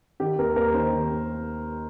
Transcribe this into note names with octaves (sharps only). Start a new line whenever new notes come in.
D#3 G4
D#2 A#4
D#2 A#4
D#3 C5
D#3
D#2